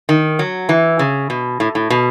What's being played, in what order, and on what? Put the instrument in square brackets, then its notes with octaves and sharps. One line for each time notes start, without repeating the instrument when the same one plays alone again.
[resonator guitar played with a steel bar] D#3
F#3
E3
C#3
B2
A2
A2
B2